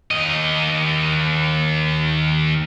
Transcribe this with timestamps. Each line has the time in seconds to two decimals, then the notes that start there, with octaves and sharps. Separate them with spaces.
0.11 D#2 D#5